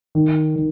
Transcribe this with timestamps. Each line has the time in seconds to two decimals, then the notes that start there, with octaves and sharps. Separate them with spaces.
0.15 D#3
0.56 D#3